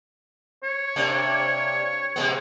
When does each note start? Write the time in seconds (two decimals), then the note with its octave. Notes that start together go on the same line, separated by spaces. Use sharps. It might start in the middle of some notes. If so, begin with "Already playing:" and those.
0.64 C#5
0.96 C3 A#3 D4
2.16 C3 G#3 B3